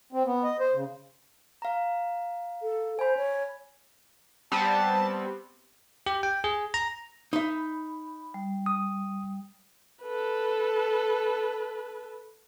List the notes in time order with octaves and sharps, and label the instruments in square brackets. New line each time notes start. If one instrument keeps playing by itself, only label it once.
[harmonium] C4
B3
D#5
C5
C#3
[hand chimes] F5 A#5
[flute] A4
[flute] C5 [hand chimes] G#5 B5
[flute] C#5
[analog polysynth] G3 B3 C4 [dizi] A5
[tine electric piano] G4
G5
G#4
A#5
[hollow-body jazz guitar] D#4 E5 [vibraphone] B5
[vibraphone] G3
[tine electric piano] D#6
[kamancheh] A4 B4